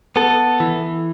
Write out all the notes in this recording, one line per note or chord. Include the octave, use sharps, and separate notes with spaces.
B3 A4
E3